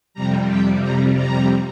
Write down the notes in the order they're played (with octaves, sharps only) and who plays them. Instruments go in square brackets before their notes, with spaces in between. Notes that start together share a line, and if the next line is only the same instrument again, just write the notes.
[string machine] F2 C3 G3 A#5
G5
A#5
A#5